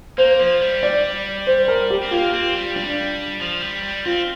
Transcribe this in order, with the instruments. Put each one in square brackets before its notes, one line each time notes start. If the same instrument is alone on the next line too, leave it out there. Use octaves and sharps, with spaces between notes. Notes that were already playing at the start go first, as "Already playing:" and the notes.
[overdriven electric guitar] A#3 [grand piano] C5
[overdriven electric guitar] F3
G3
[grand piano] D5
C5
A#4
G4
[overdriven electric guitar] C4
[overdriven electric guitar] A#3 [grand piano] F4
[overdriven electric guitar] C4
G3
[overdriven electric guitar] G3 [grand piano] D4
[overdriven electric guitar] F3
G3
G3
[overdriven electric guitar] C4 [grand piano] F4